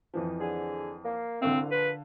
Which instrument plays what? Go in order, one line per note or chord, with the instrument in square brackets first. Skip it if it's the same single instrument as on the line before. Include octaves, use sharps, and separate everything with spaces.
[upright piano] F2 E3 F3
[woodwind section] D3 G#4
A#3
[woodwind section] C2 [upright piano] D3 F5 [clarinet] C4
[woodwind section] A#2 F3 [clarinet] B4